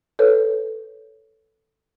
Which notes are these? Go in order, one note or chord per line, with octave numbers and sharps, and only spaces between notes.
A4 B4 C#5